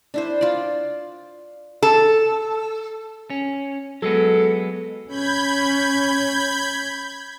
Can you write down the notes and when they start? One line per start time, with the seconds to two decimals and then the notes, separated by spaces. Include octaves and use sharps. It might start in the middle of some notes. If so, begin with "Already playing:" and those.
0.14 D4 E4 C5
0.41 F4 D5
1.82 A4
3.30 C#4
4.02 F#3 G#3 B3 A4
5.08 C#4 B5 G6 G#6